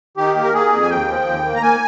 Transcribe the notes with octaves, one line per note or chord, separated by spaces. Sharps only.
D#3 G4
A#3
A#4
A#3 G#4
F2
G#5
D#2 G5
F3
D#2
A#3
A#5
A#3 G#5